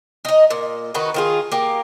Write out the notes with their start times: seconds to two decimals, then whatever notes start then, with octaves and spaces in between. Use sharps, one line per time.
0.25 D#4 D#5
0.50 A#2
0.94 D#3 D#4 F#4 B4
1.14 D#3 F4 G#4
1.52 A#3 G4